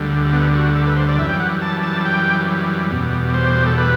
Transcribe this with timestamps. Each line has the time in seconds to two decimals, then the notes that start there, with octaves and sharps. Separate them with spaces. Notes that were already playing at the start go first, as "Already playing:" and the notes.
Already playing: D2 D3 G3
0.33 B3
0.55 F#4
0.75 A4
0.87 B4
0.97 C5
1.09 D5
1.19 F#2 E3 G3 E5
1.29 G5
1.40 F#5
1.62 A5
1.83 A5
2.05 G5
2.90 E2 B2 G3
3.34 C5
3.66 A4
3.77 B4